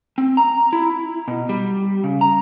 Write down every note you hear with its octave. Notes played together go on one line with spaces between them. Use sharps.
C4
A#5
E4
B2
G3
C#3
A#5